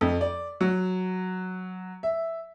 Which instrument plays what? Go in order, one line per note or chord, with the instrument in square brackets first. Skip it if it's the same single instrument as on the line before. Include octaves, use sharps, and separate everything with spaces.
[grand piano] F2
D5
F#3
E5